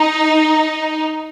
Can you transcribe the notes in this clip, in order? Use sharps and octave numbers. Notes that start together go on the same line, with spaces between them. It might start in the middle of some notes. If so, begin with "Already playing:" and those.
Already playing: D#4